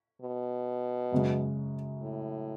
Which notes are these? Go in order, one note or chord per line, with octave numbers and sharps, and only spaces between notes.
B2
F#2 C#3 G#3
A2